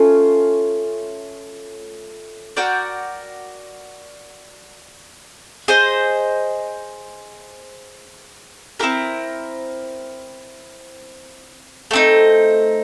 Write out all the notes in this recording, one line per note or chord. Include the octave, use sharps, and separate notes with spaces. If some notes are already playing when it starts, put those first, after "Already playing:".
Already playing: A3 C#4 F4
F#4 A#4 D5 G5
G#4 C5 D#5
C4 E4 G4 A#4
A3 C4 D#4